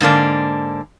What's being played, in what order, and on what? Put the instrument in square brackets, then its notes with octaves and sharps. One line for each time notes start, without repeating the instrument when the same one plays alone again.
[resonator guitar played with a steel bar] G#2 D3 A#3 D4